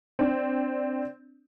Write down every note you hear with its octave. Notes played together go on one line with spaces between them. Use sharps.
C4 D4